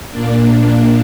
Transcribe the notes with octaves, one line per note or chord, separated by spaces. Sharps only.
A#2 A#3 D4